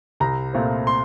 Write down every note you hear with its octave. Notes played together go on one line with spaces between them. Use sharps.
C2 A#5
A#2 A3 C4
C6